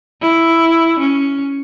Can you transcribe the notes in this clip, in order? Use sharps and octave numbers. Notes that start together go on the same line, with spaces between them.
E4
C#4